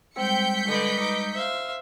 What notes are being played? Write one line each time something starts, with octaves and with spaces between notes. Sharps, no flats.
G3 G#3 C4 G5 E6 G6 B6 C#7
D3 B4 D5 D#5
D#4 D6
C5 E5 F5